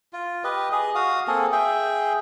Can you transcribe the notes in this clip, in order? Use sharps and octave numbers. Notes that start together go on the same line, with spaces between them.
F4
G4 B4 D#5
G#4 D#5
F#4 F5 D#6
A#3 C4 G#4 A4
G#4 E5 G5